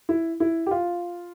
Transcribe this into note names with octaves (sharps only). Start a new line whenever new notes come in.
E4
E4
G4
F4